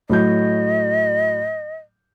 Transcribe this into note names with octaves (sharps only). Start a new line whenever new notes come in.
A2 F#3 D#5 G6